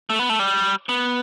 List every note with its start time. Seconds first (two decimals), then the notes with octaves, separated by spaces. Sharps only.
0.10 A3
0.19 B3
0.30 A3
0.39 G3
0.89 B3